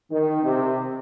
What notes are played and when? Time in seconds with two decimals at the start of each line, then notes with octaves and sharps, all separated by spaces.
0.10 D#3
0.43 C3